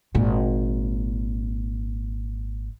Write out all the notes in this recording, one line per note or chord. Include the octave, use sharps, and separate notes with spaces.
G#1 A#2